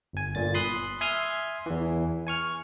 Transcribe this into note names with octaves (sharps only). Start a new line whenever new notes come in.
G1 G#5
G1 A#2 A6
B5 C6 D#6 F#6
E5 G#5 C6 D#6 F6 G#6
E2 E3
G#5 C#6 F6